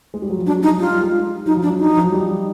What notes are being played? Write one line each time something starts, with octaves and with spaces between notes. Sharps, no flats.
G#3
G3
F#3
F3
F#3 D4
G3
D#4
F#3
G3 F4
G3
G#3
F#3 D#4
F3
D4
F#3
D#4
F3
F#3
G3